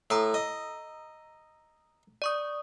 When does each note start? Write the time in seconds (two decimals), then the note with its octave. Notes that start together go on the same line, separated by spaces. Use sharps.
0.10 A2 A#5 D#6 E6
0.34 D#5
2.22 D5 C#6 D#6